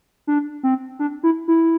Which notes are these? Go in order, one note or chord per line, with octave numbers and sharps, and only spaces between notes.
D4
C4
D4
E4
E4